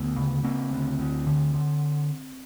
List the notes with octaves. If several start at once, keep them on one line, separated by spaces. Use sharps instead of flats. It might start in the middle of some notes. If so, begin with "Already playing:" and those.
Already playing: D2 B3
C#3
C#3 A#3 C4
D2
D2
D3
D3